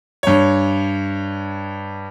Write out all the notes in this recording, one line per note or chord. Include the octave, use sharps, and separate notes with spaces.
G2 C#5